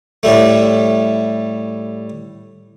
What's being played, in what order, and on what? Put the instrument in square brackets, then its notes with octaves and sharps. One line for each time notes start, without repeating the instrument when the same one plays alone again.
[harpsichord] A2 G3 A3